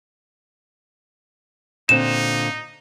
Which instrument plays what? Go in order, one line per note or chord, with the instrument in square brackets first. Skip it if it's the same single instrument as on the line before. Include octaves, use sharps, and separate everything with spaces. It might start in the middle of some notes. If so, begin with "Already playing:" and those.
[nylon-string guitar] A#2 D3 C4 [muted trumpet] D#4 [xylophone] E7